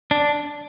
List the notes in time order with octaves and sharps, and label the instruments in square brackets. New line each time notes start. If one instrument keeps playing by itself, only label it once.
[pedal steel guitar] D4